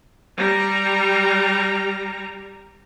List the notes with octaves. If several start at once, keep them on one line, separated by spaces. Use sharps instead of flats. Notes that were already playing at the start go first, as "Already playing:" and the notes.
G3 A#5